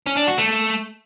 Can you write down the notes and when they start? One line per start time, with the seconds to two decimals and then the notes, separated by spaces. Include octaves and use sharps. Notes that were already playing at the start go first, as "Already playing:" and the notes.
0.06 C#4
0.17 D4
0.27 F#4
0.38 A3